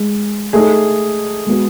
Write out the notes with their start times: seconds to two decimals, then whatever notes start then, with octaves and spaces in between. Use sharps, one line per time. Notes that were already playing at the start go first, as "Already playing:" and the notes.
Already playing: G#3
0.53 A3 D#4 G#4 A4
1.46 G#3 B3 F#4